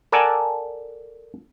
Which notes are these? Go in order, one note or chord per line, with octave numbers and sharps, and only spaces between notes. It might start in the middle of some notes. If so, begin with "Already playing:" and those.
A4 A#4 D5 F#5 G#5 A5